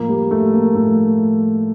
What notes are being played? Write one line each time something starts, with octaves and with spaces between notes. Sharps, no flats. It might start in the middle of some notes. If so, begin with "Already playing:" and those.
Already playing: A2 F3 A#3
G3
A3
A#3
A2 F3 A3